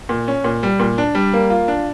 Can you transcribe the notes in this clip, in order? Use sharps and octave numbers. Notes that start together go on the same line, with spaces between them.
A#2
C#4
A#2
G3
A#2
D4
G3
A#3
F4
D4